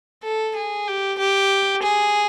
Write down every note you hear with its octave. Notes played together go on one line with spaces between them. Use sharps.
A4
G#4
G4
G4
G#4